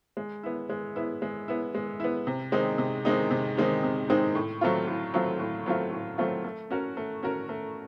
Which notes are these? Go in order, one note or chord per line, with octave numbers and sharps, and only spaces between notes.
G#3
B3 E4
G#3
B3 E4
G#3
B3 E4
G#3
B3 E4
C3
D#3 G#3 C4 D#4
C3
D#3 G#3 C4 D#4
C3
D#3 G#3 C4 D#4
C3
D#3 G#3 C4 D#4
A2
F#3 A3 C4 F4
A2
F#3 A3 C4 F4
A2
F#3 A3 C4 F4
A2
F#3 A3 C4 F4
A3
C#4 F#4 A#4
A3
C#4 F#4 A#4
A3